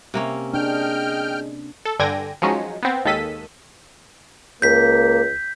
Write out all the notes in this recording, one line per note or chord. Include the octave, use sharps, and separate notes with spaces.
C3 A#3 C#4
D4 G#4 D#5 G5 F6 G6
A4
G2 D3 G5 G#5 G#6 A#6
F3 F#3 G#3 C#4 D#4
B3 C4
D#2 D#3 G#3 A4 B6 D#7
C#2 A#3 G6 B6